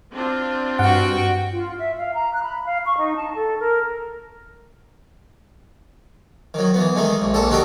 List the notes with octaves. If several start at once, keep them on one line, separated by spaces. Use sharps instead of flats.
C4 D4 F4
G2 F#4 F#5 G5
F4
E5
F5
A#5
F#6
B5
F5
C#6
D#4
A5
A4
A#4
D#3 F#3
E3 B3
D#3 G#3 A3 D#4
A#1
A#1 A#2 A4 A5
D#3 D#4 F#4 G4 A4